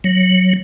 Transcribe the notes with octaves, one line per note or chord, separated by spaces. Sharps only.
F#3